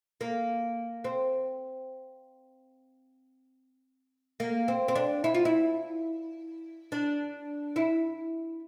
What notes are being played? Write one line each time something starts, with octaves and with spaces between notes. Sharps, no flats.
A#3
C4
A#3
C4
C4
D4
E4
F4
E4
D4
E4